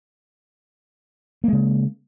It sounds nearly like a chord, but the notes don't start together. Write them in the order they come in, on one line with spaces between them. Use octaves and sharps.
A#3 G#3 C#3